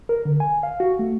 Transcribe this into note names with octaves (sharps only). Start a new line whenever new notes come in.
A#4
D3
G#5
F5
F#4
A3